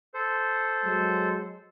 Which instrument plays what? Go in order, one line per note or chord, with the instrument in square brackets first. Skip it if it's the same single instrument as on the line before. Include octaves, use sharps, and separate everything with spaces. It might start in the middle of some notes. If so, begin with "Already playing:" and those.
[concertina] A4 C5
[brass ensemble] F#3 G#3